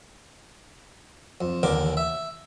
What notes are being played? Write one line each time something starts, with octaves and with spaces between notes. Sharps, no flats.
F2
A1 D#2 D3 A#4 D6
E5